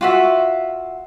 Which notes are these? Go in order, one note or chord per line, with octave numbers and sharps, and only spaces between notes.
F4 F#4 E5